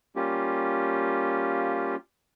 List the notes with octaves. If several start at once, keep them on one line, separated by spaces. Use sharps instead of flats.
G3 A#3 C#4 F4 G4